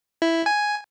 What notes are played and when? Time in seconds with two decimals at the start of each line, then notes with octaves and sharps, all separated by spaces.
0.22 E4
0.46 G#5